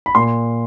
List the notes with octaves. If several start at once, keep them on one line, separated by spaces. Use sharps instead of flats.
B5
A#2 C6